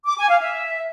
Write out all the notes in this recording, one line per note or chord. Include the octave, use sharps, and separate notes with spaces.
D6
G#5
F5
E5